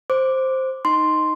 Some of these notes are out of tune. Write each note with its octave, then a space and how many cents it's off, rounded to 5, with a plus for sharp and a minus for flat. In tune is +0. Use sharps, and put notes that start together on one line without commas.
C5 +5 D6 +0
D#4 +0 C6 +0